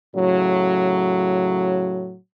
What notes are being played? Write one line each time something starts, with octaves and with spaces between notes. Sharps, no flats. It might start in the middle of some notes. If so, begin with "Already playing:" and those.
A2 C#3 F#3